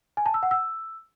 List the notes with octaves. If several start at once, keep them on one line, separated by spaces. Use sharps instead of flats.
G#5
A5
E6
F#5
E6